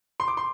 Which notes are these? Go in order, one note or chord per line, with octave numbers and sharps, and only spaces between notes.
C6
D6
C6